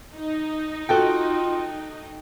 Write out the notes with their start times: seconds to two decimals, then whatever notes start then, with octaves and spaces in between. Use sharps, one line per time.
0.16 D#4
0.89 F4 F#4 A4 G5